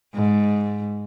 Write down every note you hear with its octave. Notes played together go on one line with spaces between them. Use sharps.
G#2